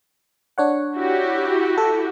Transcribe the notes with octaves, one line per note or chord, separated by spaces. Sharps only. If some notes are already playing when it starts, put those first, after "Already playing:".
D4 C#5 F#5
E4 F#4 G4
A4